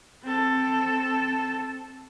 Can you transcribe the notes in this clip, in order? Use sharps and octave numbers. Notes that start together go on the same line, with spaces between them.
C4 A4